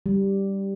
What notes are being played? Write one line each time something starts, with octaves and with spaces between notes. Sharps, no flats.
G3